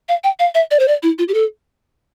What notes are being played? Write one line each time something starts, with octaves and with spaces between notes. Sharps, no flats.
F5
G5
F5
E5
D5
C5
D5
E4
F4
G4
A4